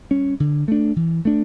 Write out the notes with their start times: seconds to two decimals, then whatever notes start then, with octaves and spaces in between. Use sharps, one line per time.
0.11 G3 C#4
0.40 D3
0.68 A3 D4
0.96 E3
1.25 A3 D4